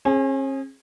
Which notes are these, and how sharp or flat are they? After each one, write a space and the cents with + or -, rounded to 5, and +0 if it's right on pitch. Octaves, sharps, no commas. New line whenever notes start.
C#4 -45 G#4 +0